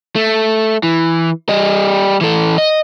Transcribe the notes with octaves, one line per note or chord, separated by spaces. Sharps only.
A3
E3
G3 D#5
E3 A4
D#5